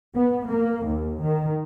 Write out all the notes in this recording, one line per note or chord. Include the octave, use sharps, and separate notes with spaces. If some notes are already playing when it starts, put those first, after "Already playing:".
B3
A#3
D#2
D#3